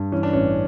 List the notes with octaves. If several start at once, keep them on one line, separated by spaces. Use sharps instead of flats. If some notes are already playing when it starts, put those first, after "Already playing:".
Already playing: G2
E3 C#4
D4
A1 C#4